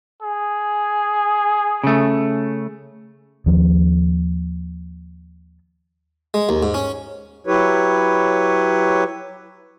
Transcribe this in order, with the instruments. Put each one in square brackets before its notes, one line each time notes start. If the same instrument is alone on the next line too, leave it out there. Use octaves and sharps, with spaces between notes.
[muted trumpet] G#4
[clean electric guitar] C#3 A3
[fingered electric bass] D#2 F3
[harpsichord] G#3
D#2
G#2
C#4
[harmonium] F#3 E4 G4 B4 C#5